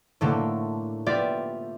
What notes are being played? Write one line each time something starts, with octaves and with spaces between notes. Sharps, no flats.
A2 D3 A3 A#3
B3 F4 G4 D5 E5